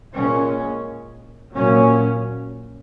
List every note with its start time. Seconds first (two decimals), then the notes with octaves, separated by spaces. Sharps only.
0.14 A#2 G#3 C#4
1.54 A#2 F#3 C#4